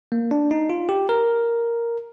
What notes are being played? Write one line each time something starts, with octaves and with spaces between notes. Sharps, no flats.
A#3
D4
D#4
F4
G4
A#4